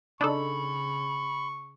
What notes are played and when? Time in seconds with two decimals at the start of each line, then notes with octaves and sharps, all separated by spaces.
0.21 C#3 D4 D#4 A4 B5 C#6